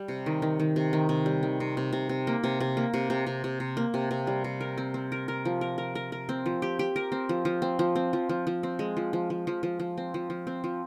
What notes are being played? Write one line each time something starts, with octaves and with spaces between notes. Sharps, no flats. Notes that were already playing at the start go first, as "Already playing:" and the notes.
Already playing: G3
C3
D#3
D#3
D#3
C3
D#3
C3
G3
D#3
C3
C3
C3
C3
A#3
C3
C3
A#3
C3
C3
C3
C3
C3
A#3
C3
C3
G3
C3
A#4
C4
C4
A#4
A#4
F3
A#4
A#4
A#4
A#4
C4
F3
G4
G4
A#4
C4
F3
F3
C4
F3
C4
F3
F3
F3
C4
G#3
F3
F3
F3
F3
F3
F3
C4
F3
F3
C4
F3